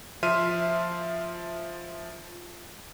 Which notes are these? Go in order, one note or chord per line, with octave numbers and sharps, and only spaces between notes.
F3 E5 C6 F6 D#7